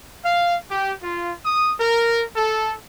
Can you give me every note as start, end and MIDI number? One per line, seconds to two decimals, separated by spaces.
0.23 0.55 77
0.69 0.91 67
1.01 1.31 65
1.43 1.73 87
1.78 2.22 70
2.35 2.73 69